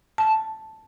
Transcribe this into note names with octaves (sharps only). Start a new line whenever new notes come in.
A5